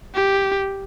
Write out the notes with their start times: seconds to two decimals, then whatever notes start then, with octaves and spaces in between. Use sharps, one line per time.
0.15 G4